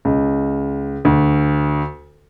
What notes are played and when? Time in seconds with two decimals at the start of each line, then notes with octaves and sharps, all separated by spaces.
0.05 C#2
1.05 D2